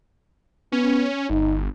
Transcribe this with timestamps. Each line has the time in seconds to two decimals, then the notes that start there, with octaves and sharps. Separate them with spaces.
0.72 B3 C#4
1.30 G1 D#4